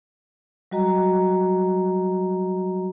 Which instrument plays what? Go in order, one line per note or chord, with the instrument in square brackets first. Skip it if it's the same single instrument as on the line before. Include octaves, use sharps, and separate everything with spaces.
[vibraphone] F#3 G3 F#4 D#5 A#5